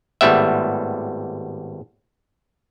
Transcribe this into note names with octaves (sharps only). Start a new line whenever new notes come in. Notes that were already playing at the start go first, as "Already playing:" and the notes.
G#1 A2 G3 B3 E5